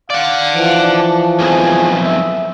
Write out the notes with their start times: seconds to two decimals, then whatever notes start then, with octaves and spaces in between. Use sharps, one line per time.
0.10 D5 F5 F#5
0.53 E3 F3
0.82 D4
1.39 B1 F2 G#4
2.01 E5